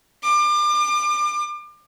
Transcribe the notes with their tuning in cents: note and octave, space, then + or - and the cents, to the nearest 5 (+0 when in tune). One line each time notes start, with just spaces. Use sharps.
D6 +35